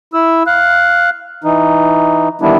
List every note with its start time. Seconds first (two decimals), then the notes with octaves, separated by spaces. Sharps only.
0.14 E4 E6
0.47 F5 F#6
1.44 E3 D#4
2.41 D#3 E3 G3 B3 D4 E4